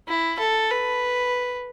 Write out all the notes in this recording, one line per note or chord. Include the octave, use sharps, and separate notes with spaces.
E4
A4
B4